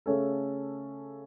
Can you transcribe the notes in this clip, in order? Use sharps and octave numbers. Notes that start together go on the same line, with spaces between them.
C#3 A3 C#4 A4